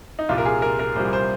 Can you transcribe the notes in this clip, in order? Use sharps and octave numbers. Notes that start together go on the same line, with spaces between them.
D#4
C2 A#2 G3 F4
A#4
G#4
A#4
A#4
C2 A#2 G3 C5
C5